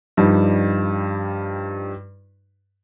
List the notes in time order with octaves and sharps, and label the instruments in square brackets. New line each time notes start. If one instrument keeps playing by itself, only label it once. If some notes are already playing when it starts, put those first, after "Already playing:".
[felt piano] G2 F3 G3 D#4